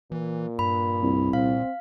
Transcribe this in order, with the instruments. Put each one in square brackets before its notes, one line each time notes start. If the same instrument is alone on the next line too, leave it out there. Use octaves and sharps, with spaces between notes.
[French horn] A#2 [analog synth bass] E3
[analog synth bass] G2 [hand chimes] B5
[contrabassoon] C2
[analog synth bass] A#2 [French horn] C4 [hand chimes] F5